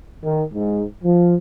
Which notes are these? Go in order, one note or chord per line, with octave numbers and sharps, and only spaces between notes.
D#3
G#2
F3